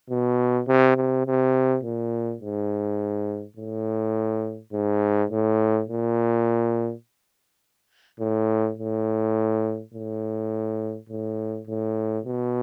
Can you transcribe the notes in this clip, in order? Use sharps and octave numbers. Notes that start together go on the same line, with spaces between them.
B2
C3
C3
C3
A#2
G#2
A2
G#2
A2
A#2
A2
A2
A2
A2
A2
B2